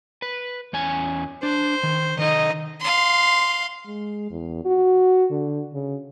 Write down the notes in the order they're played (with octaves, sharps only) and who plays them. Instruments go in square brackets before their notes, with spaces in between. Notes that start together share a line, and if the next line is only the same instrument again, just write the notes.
[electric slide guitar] B4
E2 C#4 G#5
[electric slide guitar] D4 [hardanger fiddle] C5
[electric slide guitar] D#3
[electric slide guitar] D#3 A4 [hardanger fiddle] D#4 D#5
[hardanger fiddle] F5 C6
[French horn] G#3
E2
F#4
D3
C#3